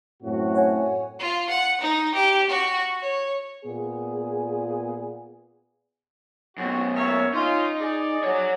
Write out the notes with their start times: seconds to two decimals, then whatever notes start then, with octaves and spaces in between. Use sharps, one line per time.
0.23 F#2 A2 C4 F#4
0.55 C#5 F#5 G#5
1.20 F4
1.50 F#5
1.81 D#4
2.15 G4
2.50 F#4
3.01 C#5
3.65 A#2 B3 G#4
6.58 F#2 B2 C4 F#4
6.95 A#3 C#5 E5
7.34 C#4 D#4 F4
7.80 G#4 D5
8.24 F#4 C#5